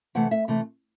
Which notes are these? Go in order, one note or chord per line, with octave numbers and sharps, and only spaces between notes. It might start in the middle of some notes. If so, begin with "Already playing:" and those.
C3 E3 A3 F#5
E5
C3 E3 A3